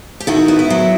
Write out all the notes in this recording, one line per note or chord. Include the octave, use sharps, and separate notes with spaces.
G4
D#3 E4 F#4
B3
E4
F#3